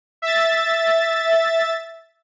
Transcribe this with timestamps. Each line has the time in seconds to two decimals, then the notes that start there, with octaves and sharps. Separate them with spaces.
0.22 E5 A6